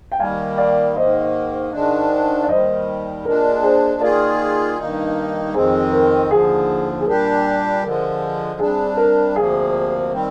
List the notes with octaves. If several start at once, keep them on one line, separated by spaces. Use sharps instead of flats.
G5
D#2 D#3 G3 A#3 F5 G#5
D5 F5
G#2 D#3 A#3 C5 D#5
G#2 D#3 G#3 D4
D5
D#2 D#3 G3 C5 D#5
A#2 G#3 D4 A#4
G#4 C5
D#3 A#3 F4 G#4 A#4 D5
G2 D#3 A#3 D#4
F2 D#3 G#3 C4 G#4 C5
A#4
D#2 D3 F3 G#4
G#4
A#2 G3 D4 G4 A#4
D3 F3 G#3 A#4
C3 G3 D4 G#4
A#4
D2 C3 F3 A#3 G#4
D#3 G3 C4